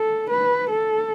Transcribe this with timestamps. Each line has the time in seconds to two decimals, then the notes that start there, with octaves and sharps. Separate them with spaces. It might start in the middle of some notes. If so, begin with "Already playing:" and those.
Already playing: A4
0.30 B4
0.70 A4